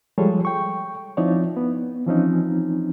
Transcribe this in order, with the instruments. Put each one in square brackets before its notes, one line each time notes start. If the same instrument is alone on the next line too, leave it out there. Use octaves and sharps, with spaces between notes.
[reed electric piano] F3 G3 G#3 G#4 A4 C#5
G5 C#6
F3 C4 D#4 E4 C#5 D5
B3
E3 F3 C4 C#4 D#4